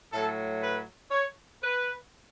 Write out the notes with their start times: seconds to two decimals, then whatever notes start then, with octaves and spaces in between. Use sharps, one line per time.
0.12 A2 F#3 A3 A4
0.62 B4
1.11 C#5
1.62 B4